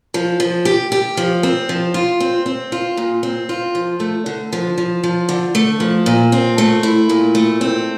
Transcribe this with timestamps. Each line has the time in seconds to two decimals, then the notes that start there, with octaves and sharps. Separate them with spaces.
0.14 F3
0.40 F3
0.65 G4
0.92 G4
1.17 F3
1.43 C4
1.69 F3
1.94 F4
2.20 C4
2.46 C4
2.72 F4
2.97 A#2
3.23 C4
3.49 F4
3.75 F3
4.00 A3
4.26 D3
4.53 F3
4.78 F3
5.04 F3
5.29 D3
5.55 A3
5.80 F3
6.06 A#2
6.32 C4
6.58 A3
6.83 E4
7.09 A#2
7.35 A3
7.61 C4